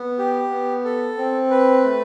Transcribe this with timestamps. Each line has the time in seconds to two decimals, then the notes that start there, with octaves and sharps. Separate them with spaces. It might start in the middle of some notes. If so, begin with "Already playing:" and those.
Already playing: B3
0.18 G4
0.51 B3
0.84 A4
1.17 C4
1.50 B4
1.84 A3